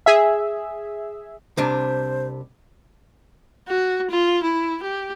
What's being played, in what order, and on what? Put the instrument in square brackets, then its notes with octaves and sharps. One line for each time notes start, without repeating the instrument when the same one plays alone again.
[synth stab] G#4 E5
[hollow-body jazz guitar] C2 C3 D4 [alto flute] C5
[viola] F#4
F4
E4
G4